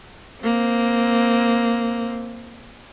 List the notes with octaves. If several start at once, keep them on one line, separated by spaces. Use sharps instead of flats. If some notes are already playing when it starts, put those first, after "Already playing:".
A#3 C4